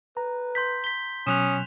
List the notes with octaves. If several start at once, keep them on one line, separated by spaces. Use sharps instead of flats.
B4 A#5
C6 G6 B6
B6 G7
B2 F#3 C#4 D#6 F#6 E7 F7